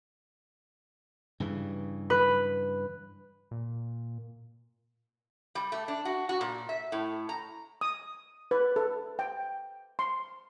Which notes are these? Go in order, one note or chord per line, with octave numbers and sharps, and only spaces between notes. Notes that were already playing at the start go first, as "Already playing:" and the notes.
G2 C#3 E3
B4
A#2
G3
A3
D4
F#4
F#4
A#2
E5
A2
A#5
D#6
B4
A4
G5
C6